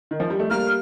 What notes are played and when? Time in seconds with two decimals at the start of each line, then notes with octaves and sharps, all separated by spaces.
0.11 D#3
0.20 F3
0.30 G3
0.40 A3
0.50 G3 A#3 F6